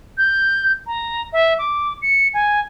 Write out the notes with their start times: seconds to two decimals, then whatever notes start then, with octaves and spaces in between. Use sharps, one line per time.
0.18 G6
0.87 A#5
1.33 E5
1.59 D6
2.02 C#7
2.34 G#5